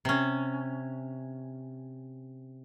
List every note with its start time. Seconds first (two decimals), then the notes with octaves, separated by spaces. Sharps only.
0.05 C3 C#4